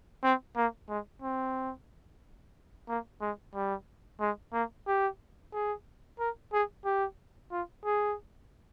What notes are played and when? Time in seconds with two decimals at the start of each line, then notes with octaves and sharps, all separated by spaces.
0.24 C4
0.56 A#3
0.89 G#3
1.22 C4
2.88 A#3
3.21 G#3
3.55 G3
4.21 G#3
4.53 A#3
4.87 G4
5.53 G#4
6.19 A#4
6.53 G#4
6.85 G4
7.52 F4
7.85 G#4